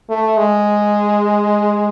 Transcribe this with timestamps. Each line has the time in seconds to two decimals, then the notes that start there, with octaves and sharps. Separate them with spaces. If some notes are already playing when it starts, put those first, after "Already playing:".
0.10 A3
0.38 G#3